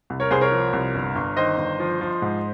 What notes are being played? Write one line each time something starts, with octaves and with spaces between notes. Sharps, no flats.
C2
A#4 C#5
C2 G#4 C5
A#4 C#5
F3
C2
G1
G1
D#3 C5 D#5
G1
F3
F3
G#2